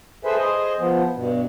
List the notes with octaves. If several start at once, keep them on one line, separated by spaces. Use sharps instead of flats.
G#4 A4 B4 C5 E5 G#5
G#4 C5 D#5 G#5
F3 B3
G2 B2